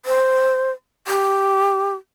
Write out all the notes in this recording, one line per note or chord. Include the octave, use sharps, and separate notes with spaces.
C5
G4